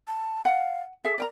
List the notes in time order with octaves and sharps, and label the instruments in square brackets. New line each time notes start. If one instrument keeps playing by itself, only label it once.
[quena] A5
[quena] F5 [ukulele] F#5
[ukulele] G#4 E5 [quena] A4
[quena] A#4 [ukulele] D5 G5 A#5